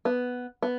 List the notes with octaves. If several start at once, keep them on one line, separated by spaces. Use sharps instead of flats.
B3
B3